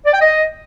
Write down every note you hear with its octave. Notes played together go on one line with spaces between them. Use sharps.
D5
G5
D#5